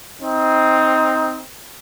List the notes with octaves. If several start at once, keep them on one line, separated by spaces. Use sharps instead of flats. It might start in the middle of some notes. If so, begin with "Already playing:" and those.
C4 D#4